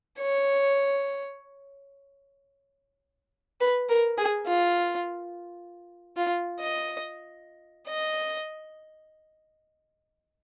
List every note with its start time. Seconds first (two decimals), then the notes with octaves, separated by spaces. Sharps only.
0.19 C#5
3.60 B4
3.89 A#4
4.18 G#4
4.46 F4
6.17 F4
6.60 D#5
7.88 D#5